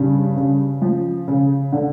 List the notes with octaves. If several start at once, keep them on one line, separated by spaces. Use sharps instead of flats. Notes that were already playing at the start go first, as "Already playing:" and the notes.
Already playing: G2 C#3
C#3
F3
C#3
D3